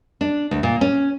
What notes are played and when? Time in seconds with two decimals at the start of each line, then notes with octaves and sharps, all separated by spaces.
0.21 D4
0.51 D2
0.63 A#2
0.81 C#4